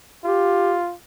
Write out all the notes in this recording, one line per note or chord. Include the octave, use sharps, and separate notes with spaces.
F4 G4